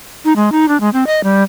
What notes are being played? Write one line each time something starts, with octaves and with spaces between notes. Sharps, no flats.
D#4
G#3
D#4
D4
G#3
C4
D#5
G3